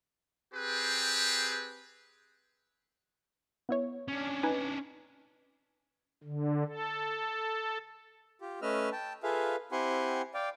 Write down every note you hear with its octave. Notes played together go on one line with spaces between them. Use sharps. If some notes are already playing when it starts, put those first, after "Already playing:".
C4 G4 G#4 B4
B3 E4 C#5
C#4 D4
D#4 B4 G#5
D3
A4
F4 G4
A3 C#4 B4 D#5 E6 F6
G5 A5
F4 G#4 A4 B4 E5 F5
C4 E4 G4 F#5 G#5 C6
D5 F5 G5